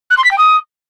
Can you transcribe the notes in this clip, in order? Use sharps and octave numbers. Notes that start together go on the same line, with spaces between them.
F#6
C6
B6
G5
D#6